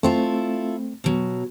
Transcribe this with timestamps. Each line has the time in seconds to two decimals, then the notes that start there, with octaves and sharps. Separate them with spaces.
0.03 A3 C4 E4 F4 A4
1.04 B2 F#3